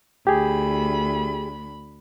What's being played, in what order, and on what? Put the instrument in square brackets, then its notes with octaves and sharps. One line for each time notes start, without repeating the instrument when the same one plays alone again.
[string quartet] D2 B5 [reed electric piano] G4 G#4